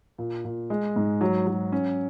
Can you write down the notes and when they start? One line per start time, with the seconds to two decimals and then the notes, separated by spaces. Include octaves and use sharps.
0.18 A#2
0.45 A#2
0.70 G#3
0.96 G#2
1.21 F#3
1.47 F#3
1.72 C#4